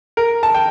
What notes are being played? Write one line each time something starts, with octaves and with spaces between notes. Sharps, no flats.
A#4
A5
G5